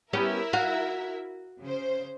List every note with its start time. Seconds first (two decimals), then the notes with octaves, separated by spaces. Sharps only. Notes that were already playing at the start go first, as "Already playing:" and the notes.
0.13 B3 C#4 E4 G4 A#4 E5
0.53 F#4 F5
1.62 C#3 C5